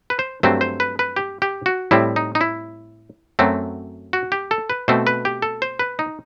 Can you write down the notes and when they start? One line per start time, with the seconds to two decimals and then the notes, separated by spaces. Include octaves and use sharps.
0.10 B4
0.19 C5
0.43 G2 F#3 A3 C4 C5
0.61 C5
0.80 B4
0.99 B4
1.16 G4
1.42 G4
1.66 F#4
1.91 A2 G3 C4 E4
2.16 D#4
2.35 D#4
2.41 E4
3.39 F#2 F#3 A3 C4
4.13 F#4
4.32 G4
4.51 A4
4.70 B4
4.88 B2 A3 C4 C5
5.07 B4
5.25 G4
5.42 A4
5.62 C5
5.79 B4
5.99 D#4